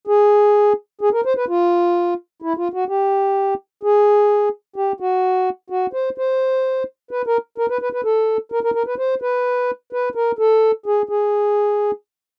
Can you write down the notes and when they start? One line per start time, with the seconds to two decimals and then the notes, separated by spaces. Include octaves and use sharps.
0.07 G#4
1.01 G#4
1.13 A#4
1.25 C5
1.37 B4
1.48 F4
2.42 E4
2.57 F4
2.74 F#4
2.89 G4
3.83 G#4
4.76 G4
5.00 F#4
5.70 F#4
5.93 C5
6.18 C5
7.11 B4
7.27 A#4
7.58 A#4
7.70 B4
7.82 B4
7.93 B4
8.05 A4
8.52 A#4
8.64 A#4
8.75 A#4
8.87 B4
8.98 C5
9.22 B4
9.93 B4
10.15 A#4
10.39 A4
10.86 G#4
11.09 G#4